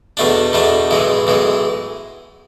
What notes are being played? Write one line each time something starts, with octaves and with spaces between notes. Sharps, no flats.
E2 B2 A3 D4
E2 B2 A3 D4
B1 A2 E3 G#3
B1 A2 E3 G#3